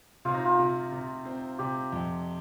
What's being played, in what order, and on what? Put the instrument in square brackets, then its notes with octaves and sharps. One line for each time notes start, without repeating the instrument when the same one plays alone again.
[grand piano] C3 [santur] F4
[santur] D#4
F4
[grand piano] C3
C3
C4
[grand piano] C3 [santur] G4
[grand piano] F2